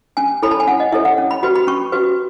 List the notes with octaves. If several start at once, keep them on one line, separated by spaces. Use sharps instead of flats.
C#4 G#5
E4 A4 C#5 B5
A5
G#5
C#4 F#5
D#5
E4 A4 C#5 E5
F#5
C#4
B5
F#4 B4 B5
B5
C#4 C#6
F#4 B4